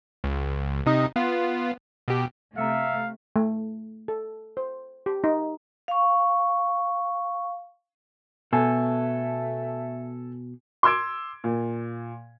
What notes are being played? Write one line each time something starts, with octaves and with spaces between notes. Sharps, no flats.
C#2
C3 D#4 D#5
B3 F4
B2 G4
C3 A3 E5 F5 A#5 C#7
A3
A4
C5
G4
D#4
F5 C#6
B2 A3 A4 G#5
C6 D6 E6 G#6 D7
A#2